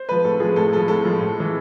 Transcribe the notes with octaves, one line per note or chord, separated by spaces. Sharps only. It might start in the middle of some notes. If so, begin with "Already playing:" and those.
Already playing: C5
F3 G#3 B4
A2 A4
F3 G#3 G#4
A2 A4
F3 G#3 A4
A2 A4
F3 G#3
A2
E3 G#3